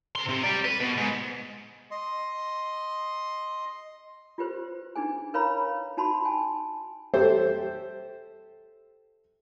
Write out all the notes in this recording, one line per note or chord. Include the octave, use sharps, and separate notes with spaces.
C3 C6
C3
G4 D5
B4
B2
G#2
D#5 C6
F4 G4 B4 C5
D4 D#4 G#4 G#5
A#4 B4 C#5 F5 A#5 B5
D#4 F#4 A5 B5 C6
G#5 A5
G4 A4 C5 E5